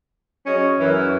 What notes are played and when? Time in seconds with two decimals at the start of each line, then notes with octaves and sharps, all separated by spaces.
0.47 F#3 C#4 G#4 D#5
0.80 F#2 E3